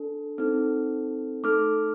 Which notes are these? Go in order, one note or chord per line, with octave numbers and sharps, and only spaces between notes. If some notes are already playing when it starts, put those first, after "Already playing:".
Already playing: D4 A4
C4 D#4 A4
A3 D#4 A4 D6 F6